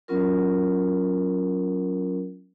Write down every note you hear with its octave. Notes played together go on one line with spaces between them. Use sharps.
F#3 B3 C#4 F4 A#4